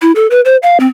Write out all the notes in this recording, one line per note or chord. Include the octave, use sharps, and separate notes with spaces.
E4
A4
B4
C5
F5
C4